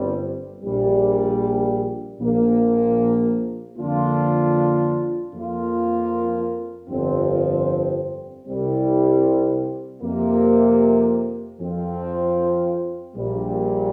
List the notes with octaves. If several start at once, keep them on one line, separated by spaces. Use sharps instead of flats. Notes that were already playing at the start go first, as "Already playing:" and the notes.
Already playing: G1 G2 G3 C4
A#1 A#2 G3
A#1 A#2 F3 A#3
F2 D3 A#3 D4 F4
F2 F3 A#3 F4
G1 F2 F3 C4
C2 C3 G3 C4
F2 C3 A#3
F2 F3 C4 F4
A#1 A#2 G3